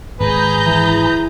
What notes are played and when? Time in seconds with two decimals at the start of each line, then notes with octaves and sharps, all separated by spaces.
0.20 G#1 G#4 B4 A#5 G6
0.66 E3